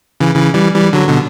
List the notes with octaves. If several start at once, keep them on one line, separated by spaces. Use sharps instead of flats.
C#3 E3
C#3 E3
E3 G3
E3 G3
D3 F#3
B2 D3